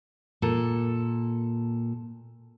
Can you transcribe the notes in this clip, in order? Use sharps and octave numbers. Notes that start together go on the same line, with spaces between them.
A#2 A4